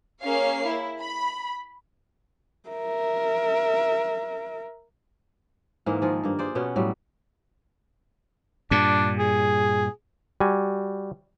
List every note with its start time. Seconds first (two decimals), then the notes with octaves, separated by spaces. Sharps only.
0.23 A#3 C#4 G#4 C#5 F5 C7
0.67 E4
1.00 B5
2.69 A#4 E5
5.86 G#2 E3 G#3 A#3
6.02 D#3 F3 F4 G#4
6.24 G2 A#3
6.39 G#4 C5 D5
6.55 B2 B3 C#4
6.76 A2 F#3 G3
8.71 G2 A#2 D4
9.19 G#4
10.40 G3 F#4 G#5